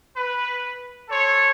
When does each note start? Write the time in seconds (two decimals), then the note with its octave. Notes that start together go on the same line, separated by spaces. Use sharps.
0.16 B4
1.09 A4 C5 C#5